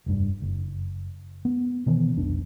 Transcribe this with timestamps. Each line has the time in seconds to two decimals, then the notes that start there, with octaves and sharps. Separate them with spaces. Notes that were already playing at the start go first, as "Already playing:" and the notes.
0.06 F1 G2
0.42 F#1
1.45 B3
1.86 B2 D#3 E3 B3
2.16 F1 B1 D4